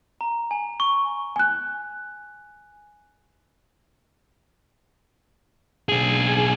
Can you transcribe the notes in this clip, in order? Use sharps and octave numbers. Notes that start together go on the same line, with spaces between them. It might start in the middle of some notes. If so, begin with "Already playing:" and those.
A#5
G#5
C#6
G#5 F#6
B1 G#4